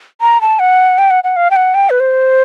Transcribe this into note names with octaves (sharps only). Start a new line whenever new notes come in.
A#5
A5
F#5
G5
F#5
F#5
F5
G5
F#5
G5
B4
C5